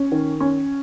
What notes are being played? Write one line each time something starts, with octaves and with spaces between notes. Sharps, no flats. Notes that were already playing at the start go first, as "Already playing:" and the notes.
Already playing: C#4
D#3
C#4